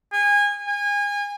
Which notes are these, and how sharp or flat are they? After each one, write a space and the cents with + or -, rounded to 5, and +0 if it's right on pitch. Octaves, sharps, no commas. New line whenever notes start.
G#5 -25
G#5 -30